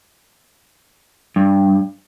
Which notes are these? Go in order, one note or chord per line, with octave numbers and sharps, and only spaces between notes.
G2